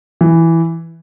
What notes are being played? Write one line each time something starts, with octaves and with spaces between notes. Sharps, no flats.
E3